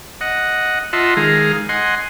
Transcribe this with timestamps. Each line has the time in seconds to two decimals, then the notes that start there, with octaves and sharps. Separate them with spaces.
0.21 D#5 F#5
0.93 F4 D#5 E5 F#5 A5 C6
1.17 D#3 G#3 G#4 F5 A#5
1.69 D#5 F#5 G#5 C6